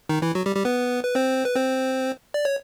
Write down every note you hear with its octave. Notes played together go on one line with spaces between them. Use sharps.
D#3 D#4
E3 E4
F#3 F#4
G3 G4
G3 G4
B3 B4
B4
C4 C5
B4
C4 C5
D5
C#5